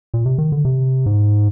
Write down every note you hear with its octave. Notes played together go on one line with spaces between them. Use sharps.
A#2
C3
D#3
D3
C3
G#2